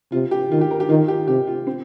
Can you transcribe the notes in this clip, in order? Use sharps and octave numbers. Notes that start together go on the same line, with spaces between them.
C3 F4
G4
D#3 F4
G4
A#4
G4
D#3 F4
G4
C3 G4
F4
C4